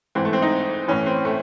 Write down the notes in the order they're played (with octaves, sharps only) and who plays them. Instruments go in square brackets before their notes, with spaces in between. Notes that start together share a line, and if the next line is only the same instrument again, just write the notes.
[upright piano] G#2 E3 C4
A3
C4
D#4
A2 E3 C#4
C4
A3